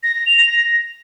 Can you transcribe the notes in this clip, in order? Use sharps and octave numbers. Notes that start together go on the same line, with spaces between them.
A#6
A#6
F7
A#6